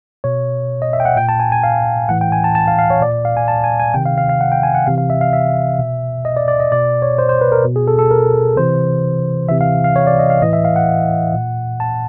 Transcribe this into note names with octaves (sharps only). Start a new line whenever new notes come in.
B2 C#5
D#5
E5
G5
F#5
A#2 G5
A5
G#5
G#5
F5
A2 E3 F#5
G5
G#5
A5
A5
F5
F5
C#5
A#2 D5
F5
G#5
A5
G#5
G#5
C3 D#3 G5
F5
F5
F5
F#5
G5
G#5
F#5
C3 E3 F5
F5
E5
F5
E5
B2
D#5
D5
D5
D#5
B2 D5
C#5
C5
C5
B4
A#4
B2
G#4
A4
A4
A#4
C3 E3 C5
C3 E3 E5
F5
F5
C#5
D5
D#5
F5
A2 E3 D#5
E5
F5
F#5
A#2
A5